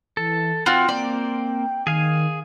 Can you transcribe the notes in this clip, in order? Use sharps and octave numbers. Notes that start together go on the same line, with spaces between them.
E3 A4
C4 F4 F#4 F#5 G5
A#3 C4 D5
D#3 G#4 F5 G#5